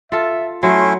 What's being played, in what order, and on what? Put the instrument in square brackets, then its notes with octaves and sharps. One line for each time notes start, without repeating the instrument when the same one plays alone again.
[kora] F4 A4 [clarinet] E5
[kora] F#3 [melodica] A3 C#4 E4 [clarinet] C6